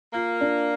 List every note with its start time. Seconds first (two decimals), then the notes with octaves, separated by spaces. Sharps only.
0.13 A#3 F4
0.41 D4